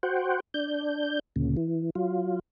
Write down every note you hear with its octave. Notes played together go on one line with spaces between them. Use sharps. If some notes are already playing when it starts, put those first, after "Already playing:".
F#4 C5 F#5 G5
D4 G6
D2 A#2 C#3
E3
F#3 F4